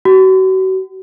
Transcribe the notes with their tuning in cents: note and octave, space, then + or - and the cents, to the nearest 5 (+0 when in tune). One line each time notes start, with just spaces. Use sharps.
F#4 +35